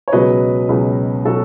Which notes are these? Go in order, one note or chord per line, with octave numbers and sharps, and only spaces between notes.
C#5
C#2 B2 F#3 B4 D#5
C#2 B2 F#3
B2 F#3 F#4 A4